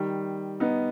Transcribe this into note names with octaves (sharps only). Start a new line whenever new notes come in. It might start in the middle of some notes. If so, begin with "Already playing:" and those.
Already playing: D#3 G3
B3 D#4